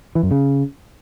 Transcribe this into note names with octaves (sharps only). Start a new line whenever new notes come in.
E3
F#2
C#3